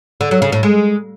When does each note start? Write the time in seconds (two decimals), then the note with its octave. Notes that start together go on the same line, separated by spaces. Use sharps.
0.21 D3
0.31 F#3
0.42 C#3
0.52 A2
0.63 G#3